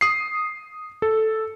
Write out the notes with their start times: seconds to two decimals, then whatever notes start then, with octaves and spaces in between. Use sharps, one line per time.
0.01 D#6 C7
1.02 A4